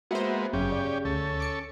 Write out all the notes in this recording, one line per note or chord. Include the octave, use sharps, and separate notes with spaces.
G#3 A#3 B3 F#4 C5 E5 F#5
G1 F#2 C#3 C#4 G4
D5
D2 C#4 A4
D6 C#7